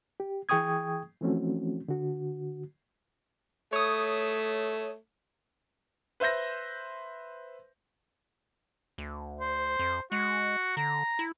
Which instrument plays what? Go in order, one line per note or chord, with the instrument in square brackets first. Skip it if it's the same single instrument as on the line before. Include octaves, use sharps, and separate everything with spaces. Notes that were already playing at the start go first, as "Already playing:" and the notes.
[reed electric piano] G4
E3 G#4 G5 C#6 D#6 G#6
E3 F3 A3 C4 C#4 F#4
D3 F#4
[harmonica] A3 [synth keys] C#5 D#6
[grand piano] B4 C5 E5 G6 A#6
[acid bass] D2
[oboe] C5
[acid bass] F2
[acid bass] G#3 [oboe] F#4
[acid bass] D3 [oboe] A#5
[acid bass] E4